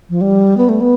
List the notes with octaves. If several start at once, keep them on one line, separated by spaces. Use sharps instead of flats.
F3
G3
B3
A3
B3